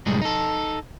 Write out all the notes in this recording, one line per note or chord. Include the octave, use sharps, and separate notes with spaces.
C2 F#2 A2 G3 G#3
D#4 A4